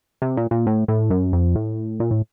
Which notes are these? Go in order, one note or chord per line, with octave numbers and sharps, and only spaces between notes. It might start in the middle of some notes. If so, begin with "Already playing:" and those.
C3
A#2
A#2
A2
A2
F#2
F2
A2
A#2
A2